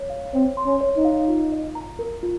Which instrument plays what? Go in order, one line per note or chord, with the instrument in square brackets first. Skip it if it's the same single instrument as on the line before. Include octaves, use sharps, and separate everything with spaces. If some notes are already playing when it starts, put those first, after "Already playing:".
Already playing: [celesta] C#5
F5
[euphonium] C4 [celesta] C#5
[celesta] C6
[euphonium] C#4
[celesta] C#5
[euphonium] D#4
[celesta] F5
F4
D#5
A#5
A#4
F4